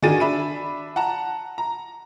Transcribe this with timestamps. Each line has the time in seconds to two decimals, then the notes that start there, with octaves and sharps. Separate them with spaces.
0.02 D#3 D4 F#4 G#4 A6 D#7
0.20 D4 E5 B5 D#7
0.96 F#5 A5 A#5
1.58 A#5